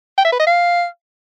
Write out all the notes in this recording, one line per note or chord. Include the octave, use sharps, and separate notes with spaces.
G5
E5
B4
D#5
F5